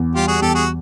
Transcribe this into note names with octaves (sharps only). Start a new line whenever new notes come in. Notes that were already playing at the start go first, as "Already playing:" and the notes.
Already playing: E2
G3 F4 G4
F#4 G#4
E2 G4 A4
F#4 G#4